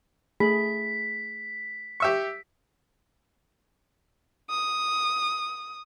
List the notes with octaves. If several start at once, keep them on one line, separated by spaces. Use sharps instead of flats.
A3 G#4 B5 B6
G4 E5 C#6
D#6